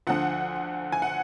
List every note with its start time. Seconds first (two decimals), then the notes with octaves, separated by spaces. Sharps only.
0.07 D2 D3 F3 F#5
0.92 G#5
1.02 F#5